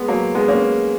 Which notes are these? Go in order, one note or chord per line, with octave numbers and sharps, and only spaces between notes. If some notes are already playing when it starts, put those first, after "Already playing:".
Already playing: G#3 B3
F#3 A#3
G#3 B3
A#3 C#4